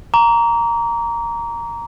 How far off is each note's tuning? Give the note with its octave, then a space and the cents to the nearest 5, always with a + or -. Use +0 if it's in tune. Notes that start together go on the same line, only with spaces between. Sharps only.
A#5 +0 D6 -40